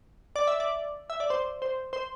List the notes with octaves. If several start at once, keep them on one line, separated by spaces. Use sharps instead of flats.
D5
E5
D5
E5
D5
C5
C5
C5